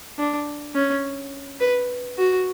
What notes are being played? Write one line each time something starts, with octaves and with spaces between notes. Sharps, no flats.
D4
C#4
B4
F#4